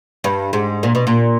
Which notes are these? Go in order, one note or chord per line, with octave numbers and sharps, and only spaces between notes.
G2
G#2
A#2
B2
A#2